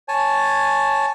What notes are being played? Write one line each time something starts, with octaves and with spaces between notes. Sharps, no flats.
C#5 G#5 A5